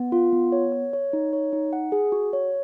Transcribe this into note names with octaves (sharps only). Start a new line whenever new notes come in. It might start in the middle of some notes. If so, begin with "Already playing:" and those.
Already playing: B3
F4
B3
C#5
C#5
C#5
D#4
C#5
D#4
F#5
G#4
F#4
C#5